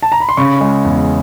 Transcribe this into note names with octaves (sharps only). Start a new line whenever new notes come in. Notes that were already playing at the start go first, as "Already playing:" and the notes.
A5
A#5
B5
C6
C#3 B5 C#6
G#3
E2